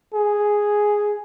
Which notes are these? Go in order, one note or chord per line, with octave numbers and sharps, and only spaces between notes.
G#4